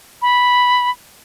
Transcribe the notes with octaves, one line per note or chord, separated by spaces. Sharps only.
B5